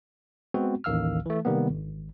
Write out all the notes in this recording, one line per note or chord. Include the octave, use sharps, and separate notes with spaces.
G#3 B3 C4 F#4
A1 D#2 D#3 F5 E6 F6
E3 A3
C3 D#3 G3 A#3 B3
G#1